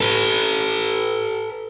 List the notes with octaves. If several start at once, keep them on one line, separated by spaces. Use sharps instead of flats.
A4 B4